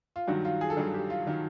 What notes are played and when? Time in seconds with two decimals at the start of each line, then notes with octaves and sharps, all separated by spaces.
0.16 F4
0.28 G2 D#3 F#3 F#4
0.45 F4
0.61 G#4
0.70 A4
0.77 G2 D#3 F#3 G#4
0.94 G4
1.10 F4
1.27 D#3 F#3